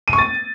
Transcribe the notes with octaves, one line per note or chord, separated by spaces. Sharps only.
D#7
C#6
A6